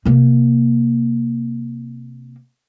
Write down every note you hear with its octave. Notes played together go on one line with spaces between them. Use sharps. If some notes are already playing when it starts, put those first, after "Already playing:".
C3 A#3